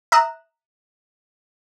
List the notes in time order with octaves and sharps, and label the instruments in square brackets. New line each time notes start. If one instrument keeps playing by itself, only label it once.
[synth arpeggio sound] E5 A#5 D#6 F#6 E7